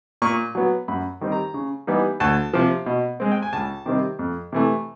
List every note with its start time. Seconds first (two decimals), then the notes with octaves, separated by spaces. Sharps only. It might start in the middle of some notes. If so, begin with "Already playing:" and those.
0.22 A#2 C#6
0.55 F#3 B3
0.88 F#2 B5
1.21 D#3 G3 C4
1.32 A#5
1.54 C#3
1.87 E3 G3 B3 D#4
2.20 D2 A5
2.53 C3 F3
2.86 B2
3.20 G#3 C4
3.32 G5
3.42 G#5
3.53 C#2 A5
3.86 C3 D#3 G3 C4
4.19 F2
4.52 C3 E3 A3